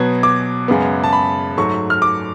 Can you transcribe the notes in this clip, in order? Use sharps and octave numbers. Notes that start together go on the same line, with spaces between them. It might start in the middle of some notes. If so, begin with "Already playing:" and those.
Already playing: B2 F#3 B3 G#6
D6
F#2 C#3 G#3 B3
A5
B5
G#2 F#3 A3 C#6
F6
D6